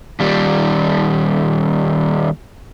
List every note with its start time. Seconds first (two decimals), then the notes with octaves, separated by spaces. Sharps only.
0.20 D#2 G3